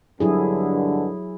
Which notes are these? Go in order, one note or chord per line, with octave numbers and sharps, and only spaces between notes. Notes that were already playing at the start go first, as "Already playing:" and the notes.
G2 B2 D3 F#3 E4 G#4